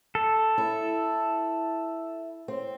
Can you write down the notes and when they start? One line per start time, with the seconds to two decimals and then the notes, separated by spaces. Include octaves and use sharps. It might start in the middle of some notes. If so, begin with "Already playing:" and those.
0.15 A4
0.58 E4
2.48 C4